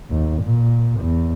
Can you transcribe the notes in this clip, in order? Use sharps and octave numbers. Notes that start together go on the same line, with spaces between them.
D#2
A#2
E2